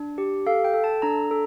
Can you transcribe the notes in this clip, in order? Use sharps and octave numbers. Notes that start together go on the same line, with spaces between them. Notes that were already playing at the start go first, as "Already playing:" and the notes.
Already playing: D4
G4
A4 F5
G5
A4
A5
D4 A#5
A4